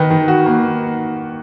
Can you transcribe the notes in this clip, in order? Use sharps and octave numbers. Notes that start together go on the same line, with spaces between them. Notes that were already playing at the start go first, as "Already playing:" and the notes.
Already playing: D#3 D#4 B4
D#3
F#4
A#3